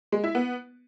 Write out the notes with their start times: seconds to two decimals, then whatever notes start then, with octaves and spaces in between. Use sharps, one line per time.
0.12 G#3
0.24 E4
0.35 B3